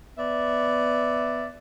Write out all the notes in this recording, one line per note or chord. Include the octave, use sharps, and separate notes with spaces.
B3 D5 E5